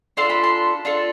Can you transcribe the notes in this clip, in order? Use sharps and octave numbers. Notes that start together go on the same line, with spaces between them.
D4 F4 A4 C6
B5
C6
D4 F4 A4